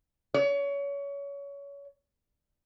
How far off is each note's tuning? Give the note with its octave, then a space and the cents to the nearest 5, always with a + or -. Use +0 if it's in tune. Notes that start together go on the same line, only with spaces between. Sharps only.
C#5 +25